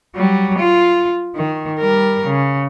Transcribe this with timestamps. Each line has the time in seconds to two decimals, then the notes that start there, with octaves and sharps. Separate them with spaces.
0.16 F#3 G3
0.59 F4
1.35 D#3
1.80 G3 A#4
2.27 C#3